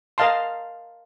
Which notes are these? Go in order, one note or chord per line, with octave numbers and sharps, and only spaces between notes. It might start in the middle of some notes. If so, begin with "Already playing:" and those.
A#4 D#5 F5 A5 C6